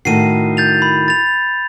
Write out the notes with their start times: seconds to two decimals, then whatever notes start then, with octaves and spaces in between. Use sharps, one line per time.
0.05 A2 D#3 F#4 C7 D#7
0.57 G6 A6 F7
0.82 B5
1.08 A6 F7